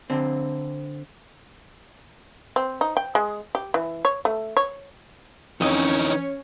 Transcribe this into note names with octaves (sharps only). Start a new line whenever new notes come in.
D3 C4
C4
D#4
G5
G#3
G4
E3
C#5
A3
C#5
F2 E3 C#4 D#4 C#5 D#5